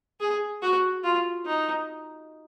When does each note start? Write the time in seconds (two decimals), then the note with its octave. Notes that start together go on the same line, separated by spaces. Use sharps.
0.20 G#4
0.62 F#4
1.04 F4
1.45 D#4